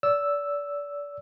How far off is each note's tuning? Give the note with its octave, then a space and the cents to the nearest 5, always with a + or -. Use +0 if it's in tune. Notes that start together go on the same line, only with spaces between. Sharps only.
D5 -30 E6 +0